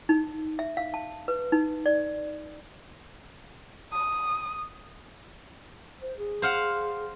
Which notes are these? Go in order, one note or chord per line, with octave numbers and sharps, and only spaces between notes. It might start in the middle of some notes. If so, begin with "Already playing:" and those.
D#4
E5
F5
A5
B4
D#4
D5
D#6
C5
G#4
C5 F5 F#5